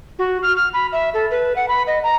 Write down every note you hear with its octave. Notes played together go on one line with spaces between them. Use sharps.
F#4
F6
F6
B5
E5
A4
B4
F#5
B5
D#5
A#5